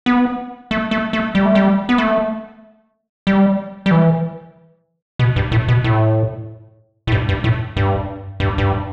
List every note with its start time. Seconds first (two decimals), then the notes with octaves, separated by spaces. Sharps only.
0.06 B3
0.71 A3
0.91 A3
1.13 A3
1.35 G3
1.46 A3
1.55 G3
1.89 B3
1.98 A3
3.27 G3
3.86 G3
3.91 E3
5.19 B2
5.36 G2
5.52 A2
5.68 B2
5.84 A2
7.07 A2
7.12 G2
7.29 G2
7.44 A2
7.77 G2
8.40 G2
8.58 G2